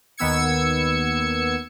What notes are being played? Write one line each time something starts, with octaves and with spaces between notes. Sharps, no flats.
D#2 D#3 B3 E6 G#6 C#7